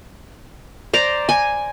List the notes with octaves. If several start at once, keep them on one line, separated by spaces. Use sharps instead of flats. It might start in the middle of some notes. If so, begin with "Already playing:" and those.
C5 D5 A#5
G#5